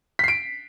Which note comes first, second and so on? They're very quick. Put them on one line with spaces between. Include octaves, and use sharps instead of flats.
B6 C7 D7